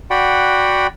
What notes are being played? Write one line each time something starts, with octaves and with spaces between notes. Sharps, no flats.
F#4 D5 F#5 G5 B5